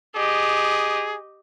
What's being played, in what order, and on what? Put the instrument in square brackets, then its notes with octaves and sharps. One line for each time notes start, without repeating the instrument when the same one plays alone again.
[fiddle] G4 D#5 [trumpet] G#4